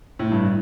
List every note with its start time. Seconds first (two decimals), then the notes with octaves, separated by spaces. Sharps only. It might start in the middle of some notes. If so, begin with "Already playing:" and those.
0.19 A2
0.32 G2